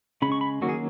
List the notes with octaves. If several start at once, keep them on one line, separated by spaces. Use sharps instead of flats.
C#3 G#3 C#4 B5
C#6
B5
D#3 F#3 A#3 C#4 F#4
G#4